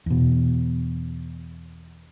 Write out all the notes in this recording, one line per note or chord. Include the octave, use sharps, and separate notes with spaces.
E2 B2